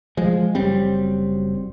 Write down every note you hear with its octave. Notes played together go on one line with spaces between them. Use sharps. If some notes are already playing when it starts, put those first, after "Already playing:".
F3 G#3
F#1 F#3 G3 C4